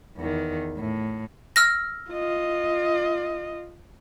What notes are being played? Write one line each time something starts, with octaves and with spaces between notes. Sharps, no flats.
E2 D#3
A2
E6 F6 A#6
F4 D#5